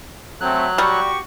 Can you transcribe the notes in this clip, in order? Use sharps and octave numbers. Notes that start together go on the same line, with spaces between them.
F#3 A3 C4 F#6
G3 F#4 G4 C#6